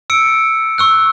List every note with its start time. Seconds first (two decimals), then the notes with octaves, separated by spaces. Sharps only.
0.10 E6 C#7 D7
0.78 C#6 E6 F#6